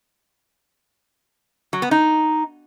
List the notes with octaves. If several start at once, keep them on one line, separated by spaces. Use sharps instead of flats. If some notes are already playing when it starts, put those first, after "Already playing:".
F#3
B3
D#4